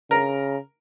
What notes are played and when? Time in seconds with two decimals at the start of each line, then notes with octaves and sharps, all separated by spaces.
0.11 C#3 A#4